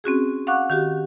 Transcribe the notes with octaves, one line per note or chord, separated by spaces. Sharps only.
C4 C#4 F#4 G#4
F5 F#5 C#6 D6 F#6
D#3 F#4 G4